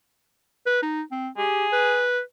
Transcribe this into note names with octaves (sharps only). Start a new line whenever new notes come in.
B4
D#4
C4
G4 G#4
B4